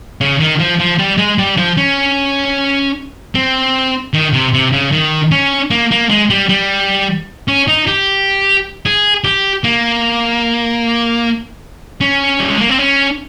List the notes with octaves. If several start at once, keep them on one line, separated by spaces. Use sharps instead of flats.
C#3
D#3
F3
F3
G3
G#3
G3
F3
C#4
C4
D#3
C3
C3
C#3
D#3
C#4
A#3
A#3
G#3
G3
G3
C#4
D#4
G4
G#4
G4
A#3
C#4
G3
G#3
A#3
C4
C#4